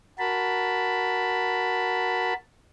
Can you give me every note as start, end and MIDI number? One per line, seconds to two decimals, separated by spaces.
0.19 2.33 66
0.19 2.33 70
0.19 2.33 81
0.19 2.33 83